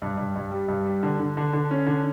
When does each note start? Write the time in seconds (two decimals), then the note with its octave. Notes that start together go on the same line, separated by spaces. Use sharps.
0.02 G2
0.17 G2
0.36 G2
0.51 G3
0.68 G2
0.86 G3
1.03 D3
1.19 D3
1.37 D3
1.53 D3
1.71 C#4
1.87 D3